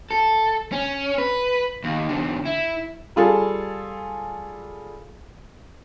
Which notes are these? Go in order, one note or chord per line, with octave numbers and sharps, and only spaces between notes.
A4
C#4
B4
D#2
E2 D3
E4
G3 F4 G#4 A4